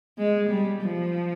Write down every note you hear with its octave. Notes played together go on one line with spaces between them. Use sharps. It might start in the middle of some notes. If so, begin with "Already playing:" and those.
G#3
G3
F3